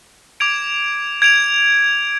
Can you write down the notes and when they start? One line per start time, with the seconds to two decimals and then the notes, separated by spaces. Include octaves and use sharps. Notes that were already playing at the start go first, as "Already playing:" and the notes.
0.40 D6 G#6 D7 F7
1.22 G#6 D7 F7